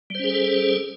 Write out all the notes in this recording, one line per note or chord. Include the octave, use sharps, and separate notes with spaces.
G3 C#4 G#4 A4 C5